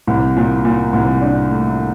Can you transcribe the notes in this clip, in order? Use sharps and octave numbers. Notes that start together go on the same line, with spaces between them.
C2
A#2
A#2
C2
D4
A3